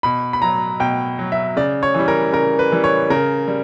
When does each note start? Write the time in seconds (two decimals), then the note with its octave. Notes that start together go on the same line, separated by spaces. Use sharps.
0.03 B2 B5
0.33 B5
0.42 F#3 A#5
0.80 B2 G5
1.19 F#3
1.32 E5
1.56 C#3 D5
1.83 C#5
1.94 E3 G3
2.08 A#4
2.33 C#3 A#4
2.59 B4
2.72 E3 G3
2.84 C#5
3.10 C#3 A#4
3.48 G3